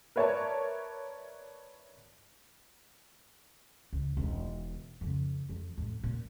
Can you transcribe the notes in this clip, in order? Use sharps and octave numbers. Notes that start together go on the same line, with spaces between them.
A#4 B4 C#5 D5 E5 A5
C#2
E1 D#4
F2 C#3
F2
F2 A2
A#2